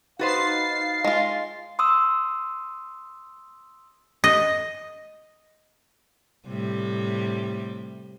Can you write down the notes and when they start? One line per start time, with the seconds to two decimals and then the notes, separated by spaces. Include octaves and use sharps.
0.19 D#4 F#4 B4 C5 F5 A6 C7
1.05 G#3 F4
1.79 C6 D#6 E6
4.24 D#5
6.47 A2 C3 G3